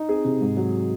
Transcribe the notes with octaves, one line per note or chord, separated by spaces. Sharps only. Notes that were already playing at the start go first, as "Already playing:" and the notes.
Already playing: D#4
C4 G#4
C3
G#2
F#3